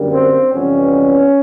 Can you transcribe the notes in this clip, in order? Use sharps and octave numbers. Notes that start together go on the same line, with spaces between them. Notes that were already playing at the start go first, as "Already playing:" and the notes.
Already playing: F#2 D3 G3 A#3
C4
F2 C3 E3 G3 B3 C#4